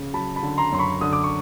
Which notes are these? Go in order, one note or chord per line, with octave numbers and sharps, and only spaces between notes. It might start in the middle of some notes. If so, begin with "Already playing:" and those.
Already playing: C#3
F#3 A5 B5
A5 B5
D3
A#5 C6
F#2 C6
B5 C#6
D3 D#6
D6
C#6